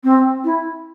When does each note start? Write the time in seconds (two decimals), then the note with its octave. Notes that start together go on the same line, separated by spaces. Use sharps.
0.03 C4
0.44 E4